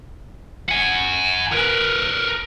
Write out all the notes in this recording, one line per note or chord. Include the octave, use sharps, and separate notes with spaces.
F#5 G#5
A#4 B4